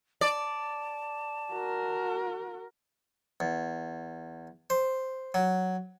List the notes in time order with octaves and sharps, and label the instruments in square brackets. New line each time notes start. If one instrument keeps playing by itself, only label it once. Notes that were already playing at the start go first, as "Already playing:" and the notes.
[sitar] D5 [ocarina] A5
[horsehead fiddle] F#4 A#4
[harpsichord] E2
C5
F#3